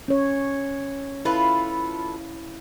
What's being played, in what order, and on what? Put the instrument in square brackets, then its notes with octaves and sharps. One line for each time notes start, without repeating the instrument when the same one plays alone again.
[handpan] C#4 C#5
[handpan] E4 F5 [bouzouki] F4 A4 B4